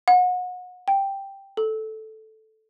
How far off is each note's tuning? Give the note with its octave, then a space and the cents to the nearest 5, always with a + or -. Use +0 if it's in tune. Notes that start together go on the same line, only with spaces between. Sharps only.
F#5 -30
G5 +0
A4 -5